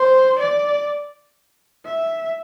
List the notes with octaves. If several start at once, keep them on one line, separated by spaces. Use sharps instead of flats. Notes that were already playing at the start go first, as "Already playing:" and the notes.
Already playing: C5
D5
E5